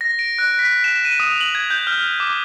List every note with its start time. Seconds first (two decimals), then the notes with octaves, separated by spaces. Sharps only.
0.01 A#6
0.19 D7
0.39 F#6
0.59 B6
0.84 E7
1.05 D#7
1.20 D#6
1.41 F#7
1.55 G#6
1.70 G6
1.87 F6
2.20 D6